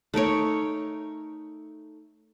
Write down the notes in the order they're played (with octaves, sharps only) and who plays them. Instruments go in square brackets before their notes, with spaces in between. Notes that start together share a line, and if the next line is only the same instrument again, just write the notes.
[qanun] A3 D#4 A#4 C#5